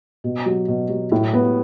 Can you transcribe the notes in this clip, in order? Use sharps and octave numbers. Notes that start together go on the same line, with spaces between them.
B2
F#3
B2
F#3
A2
B3